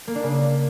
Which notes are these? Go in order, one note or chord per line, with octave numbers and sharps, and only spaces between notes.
A#3
D4
C#3